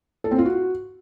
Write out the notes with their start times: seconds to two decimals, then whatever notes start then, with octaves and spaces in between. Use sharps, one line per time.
0.24 A4
0.31 C4
0.38 F4
0.45 F#4